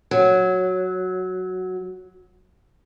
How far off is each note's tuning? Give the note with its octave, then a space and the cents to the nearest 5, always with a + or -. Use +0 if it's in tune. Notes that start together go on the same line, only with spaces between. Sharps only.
F#3 -5